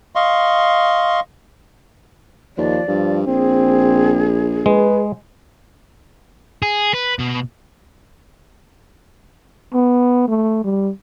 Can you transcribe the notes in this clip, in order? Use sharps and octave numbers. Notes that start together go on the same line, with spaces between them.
D#5 F5 C6 C#6
D#2 F3 D5
G2 F3
A#1 C4 G#4
G#3 B4
G#4
B4
B2
B3
A3
G3